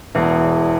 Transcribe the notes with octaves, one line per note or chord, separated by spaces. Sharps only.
E1 E2 E3